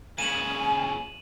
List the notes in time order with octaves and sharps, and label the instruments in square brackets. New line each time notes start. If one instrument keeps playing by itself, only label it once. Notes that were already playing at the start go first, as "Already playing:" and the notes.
[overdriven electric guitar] A#2 C#3 [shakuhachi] G#5 [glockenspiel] D#7 E7 F#7